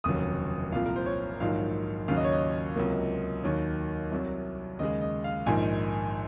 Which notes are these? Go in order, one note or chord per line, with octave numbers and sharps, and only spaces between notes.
F1 D#2 C#3 F#3 D#6
C2 A#2 F3 F5
A#4
C5
C#5
A#1 G#2 D#3 F#3 F5
D#2 C#3 F#3 F5
D#5
C#5
D#5
C#2 C3 F#3 A#3
D#2 D#3 F#3 C#5
C2 C3 F#3
D#2 C#3 G#3 D#5
D#5
F5
A#1 G#2 D#3 G#5